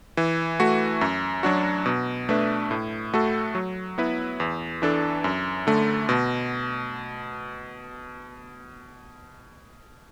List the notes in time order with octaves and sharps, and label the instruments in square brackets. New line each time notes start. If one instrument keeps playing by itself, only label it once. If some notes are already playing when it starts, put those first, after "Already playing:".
[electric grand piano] E3
A3 F#4
F#2
F#3 D4 F#4
B2
A3 D4 B4 E5
A2
A3 F#4 A4
F#3
B3 E4 B4
E2
E3 D4 A4
F#2
D3 A3
B2